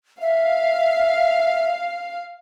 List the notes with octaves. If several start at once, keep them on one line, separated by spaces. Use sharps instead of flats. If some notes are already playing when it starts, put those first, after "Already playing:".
E5 F5